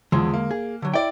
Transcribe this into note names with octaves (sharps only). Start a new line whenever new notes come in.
E2 D3 F3 G#3
A#3
G#4
D3 F#3
E4 D5 G5